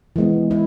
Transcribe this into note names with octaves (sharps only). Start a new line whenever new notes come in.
E3 G#3 B3
E3 E4